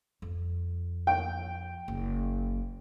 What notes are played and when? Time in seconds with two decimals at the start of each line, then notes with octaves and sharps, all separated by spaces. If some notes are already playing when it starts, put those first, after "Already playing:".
0.22 F2
1.07 G5
1.88 F#1